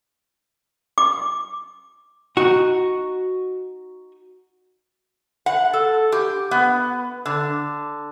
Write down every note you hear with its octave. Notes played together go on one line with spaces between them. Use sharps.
D6
D#4 F#4
F#5
A4
G4
B3
D3